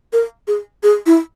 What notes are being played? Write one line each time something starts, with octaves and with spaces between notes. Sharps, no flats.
A#4
G#4
G#4
E4